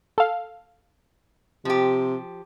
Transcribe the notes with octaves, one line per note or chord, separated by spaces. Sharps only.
A4 F5
C3 F3 G4